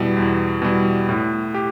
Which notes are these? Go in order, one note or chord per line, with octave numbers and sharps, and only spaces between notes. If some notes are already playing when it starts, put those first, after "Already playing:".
Already playing: E2 B2 G3 E4
E2
B2 G3 E4
A2
G4